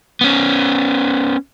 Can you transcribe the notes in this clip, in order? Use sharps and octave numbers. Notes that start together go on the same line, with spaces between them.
B3 C#4